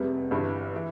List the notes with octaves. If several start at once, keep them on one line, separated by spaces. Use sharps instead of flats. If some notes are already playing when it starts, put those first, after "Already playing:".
Already playing: F1 E2 C3 G3 B3
G1 G2 E3
E3